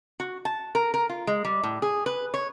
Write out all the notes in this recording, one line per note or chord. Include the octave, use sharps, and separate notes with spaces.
F#4
A5
A#4
A#4
F4
G#3
G3
A2
G#4
B4
C#5